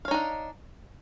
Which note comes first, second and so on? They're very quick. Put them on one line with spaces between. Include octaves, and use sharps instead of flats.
F5 C#5 D#4 D4